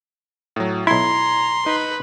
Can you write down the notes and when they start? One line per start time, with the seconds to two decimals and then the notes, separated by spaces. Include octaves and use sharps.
0.56 A2 F#3
0.87 B1 E4 A#5 C6 G#6
1.66 D#4 B4